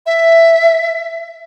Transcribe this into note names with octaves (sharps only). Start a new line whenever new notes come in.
E5